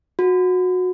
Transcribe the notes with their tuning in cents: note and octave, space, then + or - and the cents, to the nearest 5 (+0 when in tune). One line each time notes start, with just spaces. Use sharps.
F#4 -20